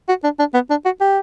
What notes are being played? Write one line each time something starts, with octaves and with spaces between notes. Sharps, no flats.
F#4
D4
D4
B3
D4
F#4
G4